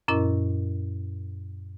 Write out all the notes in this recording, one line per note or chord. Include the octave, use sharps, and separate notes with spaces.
F#2 A#2 C#4 E4 A#4 D#5